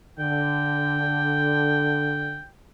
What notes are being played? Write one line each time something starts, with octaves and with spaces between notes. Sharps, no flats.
D3 G5